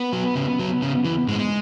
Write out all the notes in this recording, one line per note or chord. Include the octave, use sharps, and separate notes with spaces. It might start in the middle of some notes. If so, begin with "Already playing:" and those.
Already playing: B3
F#3
C#3
F#3
C#3
E3
A2 G#3